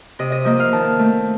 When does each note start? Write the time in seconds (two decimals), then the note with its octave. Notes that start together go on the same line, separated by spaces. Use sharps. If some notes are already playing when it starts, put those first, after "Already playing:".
0.19 C3 D#5
0.32 D#5
0.44 F3 A#3 D#5
0.60 F5
0.73 D#3 A5
0.99 A3 C4